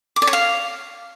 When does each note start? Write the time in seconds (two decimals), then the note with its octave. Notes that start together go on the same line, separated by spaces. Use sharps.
0.16 D6
0.22 D5
0.27 C#5
0.33 F5